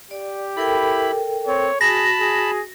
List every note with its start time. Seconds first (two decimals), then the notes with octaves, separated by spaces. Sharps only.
0.11 G4 D5
0.57 E4 A4 A#4 G5 B5
1.47 C4 C#5
1.81 F#4 G#4 A5 B5 A#6
2.20 G#4